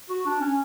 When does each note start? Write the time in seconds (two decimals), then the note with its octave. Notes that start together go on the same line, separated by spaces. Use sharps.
0.09 F#4
0.26 D4
0.41 C#4